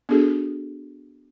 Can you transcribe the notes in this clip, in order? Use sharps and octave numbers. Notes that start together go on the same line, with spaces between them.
B3 D4 F#4 G#4 A4